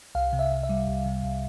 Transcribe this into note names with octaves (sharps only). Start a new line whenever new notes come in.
C2 F5
C3
E5
C2
E5
G3
C2
C3
C2